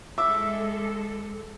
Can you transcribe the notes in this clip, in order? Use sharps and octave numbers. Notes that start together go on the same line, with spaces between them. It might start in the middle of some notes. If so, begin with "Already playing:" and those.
G#3 A4 E5 D6 E6